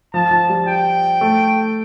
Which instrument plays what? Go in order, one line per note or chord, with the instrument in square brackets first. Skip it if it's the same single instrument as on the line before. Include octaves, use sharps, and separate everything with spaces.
[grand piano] F3 [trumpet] A5
[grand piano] F3
G3
[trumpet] G5
[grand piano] A3